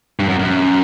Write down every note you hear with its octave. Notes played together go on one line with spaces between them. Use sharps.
G2
F#2
F#2